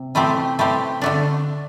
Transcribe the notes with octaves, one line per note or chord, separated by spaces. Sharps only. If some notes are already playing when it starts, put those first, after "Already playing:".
Already playing: C3
E3 A3 C4 G4
E3 A3 C4 G4
D3 A3 D4